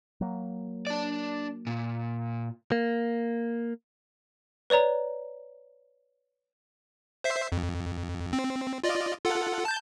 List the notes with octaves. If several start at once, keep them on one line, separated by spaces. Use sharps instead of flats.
F#3 A#3
D4 D5
A#2
A#3
B4 C#5 D5 A#5
C5 E5 C7
F2
C4
F4 D5 D#5
F4 A4 F#5
A5 G6